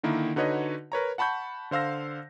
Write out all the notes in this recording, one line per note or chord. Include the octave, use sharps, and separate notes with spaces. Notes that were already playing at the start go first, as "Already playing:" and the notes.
D3 D#3 A#3 E4
D3 D#4 F#4 B4 C#5 D#5
A#4 B4 C#5 A#5
F#5 A5 B5 C#6 G6
D3 C5 F5 E6 A#6